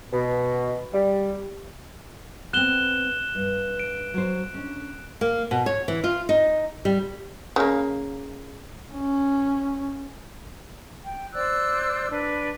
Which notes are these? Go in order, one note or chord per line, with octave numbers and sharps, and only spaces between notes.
B2
G3
B3 C4 F#6 E7 G7
G2
D7
F#3 C5
C#4 D4
A#3
B2
C#5
E3
F4
D#4
G3
C#3 A#3
C#4
G5
C5 D5 E6 F#6
D4 B4